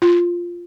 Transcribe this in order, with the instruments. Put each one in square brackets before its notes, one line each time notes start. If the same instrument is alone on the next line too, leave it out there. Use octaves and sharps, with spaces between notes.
[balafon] F4